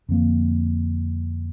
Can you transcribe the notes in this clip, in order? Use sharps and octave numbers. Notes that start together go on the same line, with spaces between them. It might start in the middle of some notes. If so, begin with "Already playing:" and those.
F2 D3 F3 A#3